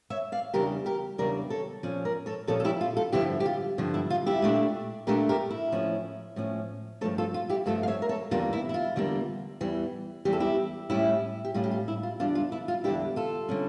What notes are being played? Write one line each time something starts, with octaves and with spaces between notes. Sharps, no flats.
C#5 E5
D5 F5
E2 C#3 G3 D4 G4 A#4
G4 A#4
E2 C#3 G3 D4 A#4 D5
A4 C#5
A#2 F3 C#4
A#4 D5
A4 C#5
A#2 F3 C#4 A4 C#5
A4
E4 G4
F4
F4 A4
G2 D3 F3 E4 G4
G4
F4
G2 D3 F3
E4
F4
E4 G4
A#2 A3 D4
A#2 A3 D4 G4 A#4
G4 A#4
E4
A2 F3 C#4
A2 F3 C#4
G2 F3 A3 A4 C#5
F4 A4
F4
E4 G4
G2 F3 A3 F4 A4
F5
C#5 E5
A#4
A4 C#5
E2 D3 G3 A#3 F4
E4
E4
F4
E2 D3 G3 A#3
E2 E3 G3
E2 E3 G3 G4
A4
E4 G4
A2 G3 C#4 E4 G4
G4
A2 G3 C#4 F4
G4
F4
E4
F4
E2 D3 G3 D4 F4
F4
E4
F4
E2 D3 G3 D4 E4 G4
F4 A4
D3 G3 C#4